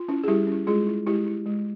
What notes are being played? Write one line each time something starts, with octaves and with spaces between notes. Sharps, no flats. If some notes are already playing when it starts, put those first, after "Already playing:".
Already playing: F4
C#4 E4
G#4
G3 E4 G4
C#4
E4
G#3 F4 G#4
E4
G#3 E4 G4
E4
G#3